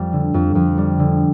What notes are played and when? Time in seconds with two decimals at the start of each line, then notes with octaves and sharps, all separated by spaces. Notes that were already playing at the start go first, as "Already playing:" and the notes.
Already playing: F2 G3
0.13 D3
0.34 F2
0.55 F2
0.78 G3
0.99 D3